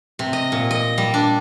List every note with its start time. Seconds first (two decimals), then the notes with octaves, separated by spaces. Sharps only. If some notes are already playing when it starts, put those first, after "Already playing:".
0.19 C3
0.33 D#5
0.52 A#2
0.71 D#5
0.98 G3
1.14 D4